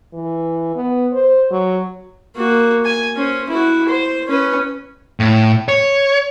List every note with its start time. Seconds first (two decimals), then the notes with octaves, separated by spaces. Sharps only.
0.13 E3
0.76 B3
1.12 C5
1.51 F#3
2.36 A#3 F#4
2.85 G#5
3.16 C#4 C5
3.49 E4 F#4
3.89 C5
4.28 C#4 B4
5.20 A2
5.68 C#5